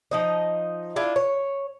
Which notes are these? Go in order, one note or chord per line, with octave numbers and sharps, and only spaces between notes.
F3 D#4 D#5
D4 E4 F4
C#5